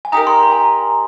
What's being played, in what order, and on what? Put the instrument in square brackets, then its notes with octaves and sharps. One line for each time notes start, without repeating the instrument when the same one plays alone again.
[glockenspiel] G#5
[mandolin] D#4 G4 A#4 [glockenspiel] A#5
[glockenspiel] C6
A#5
G#5